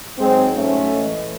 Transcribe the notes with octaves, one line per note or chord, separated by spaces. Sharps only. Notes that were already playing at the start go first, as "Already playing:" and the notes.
G#2 F#3 G#3 C4
A3 C#4
A2 E3 G#3